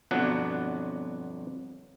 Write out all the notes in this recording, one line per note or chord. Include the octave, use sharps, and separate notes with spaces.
G1 F2 B2 F#3 D4 F#5